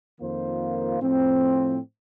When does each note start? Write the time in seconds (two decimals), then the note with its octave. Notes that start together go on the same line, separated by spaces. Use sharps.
0.21 F2 D#3 A#3 F4 C5
1.00 A2 F3 C4